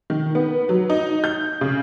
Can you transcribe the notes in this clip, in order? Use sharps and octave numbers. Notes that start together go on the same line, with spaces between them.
D#3
B3
F#3
D#4
G6
C#3